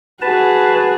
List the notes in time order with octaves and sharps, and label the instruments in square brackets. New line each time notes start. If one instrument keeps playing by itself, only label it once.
[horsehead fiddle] F#4 G#4 [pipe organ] B4 A5